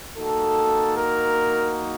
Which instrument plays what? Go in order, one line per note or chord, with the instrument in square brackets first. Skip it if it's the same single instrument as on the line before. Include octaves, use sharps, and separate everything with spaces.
[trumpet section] A#3 D#4 F#4 A4
A#4